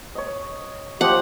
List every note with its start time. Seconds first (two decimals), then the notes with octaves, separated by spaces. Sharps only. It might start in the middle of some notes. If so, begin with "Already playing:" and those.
0.15 C#5 D#5
1.01 F3 G4 C5 D#5 F#5